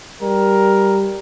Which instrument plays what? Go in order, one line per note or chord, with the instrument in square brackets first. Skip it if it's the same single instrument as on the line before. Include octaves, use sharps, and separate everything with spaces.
[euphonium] G3 [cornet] A#4